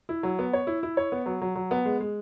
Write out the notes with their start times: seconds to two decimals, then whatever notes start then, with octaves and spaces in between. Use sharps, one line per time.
0.09 E4
0.23 F#3
0.39 B3
0.53 C#5
0.67 E4
0.83 E4
0.97 C#5
1.12 B3
1.26 F#3
1.41 F#3
1.55 F#3
1.71 B3
1.85 G#3
2.00 G#3